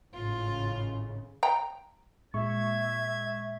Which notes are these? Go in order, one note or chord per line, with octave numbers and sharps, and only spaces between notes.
G#1 A2 C#3 F4
G5 A#5
A#2 G#3 E5 C#6 G#6